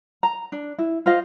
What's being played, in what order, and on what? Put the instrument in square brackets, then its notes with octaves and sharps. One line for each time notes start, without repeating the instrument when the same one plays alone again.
[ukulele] A#5
D4
E4
F4 C5 D#5 F5